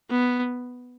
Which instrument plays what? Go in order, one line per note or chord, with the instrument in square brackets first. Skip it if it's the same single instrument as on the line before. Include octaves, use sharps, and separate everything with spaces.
[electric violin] B3